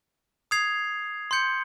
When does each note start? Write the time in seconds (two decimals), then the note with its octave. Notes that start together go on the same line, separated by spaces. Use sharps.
0.51 D#6 G#6 C7 F7
1.31 C6 G6 C#7